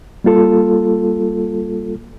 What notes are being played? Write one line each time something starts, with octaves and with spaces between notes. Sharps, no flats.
G3 A#3 F4 A4